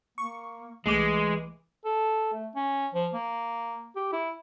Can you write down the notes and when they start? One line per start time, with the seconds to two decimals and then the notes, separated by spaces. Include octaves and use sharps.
0.18 A#3 C#6
0.86 C2 E3 G#3 A3 D6
1.85 A4
2.33 A3
2.56 C#4
2.94 F3
3.14 A#3
3.96 G4
4.12 E4